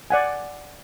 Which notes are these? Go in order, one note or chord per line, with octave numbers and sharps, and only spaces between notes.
D5 F#5 G#5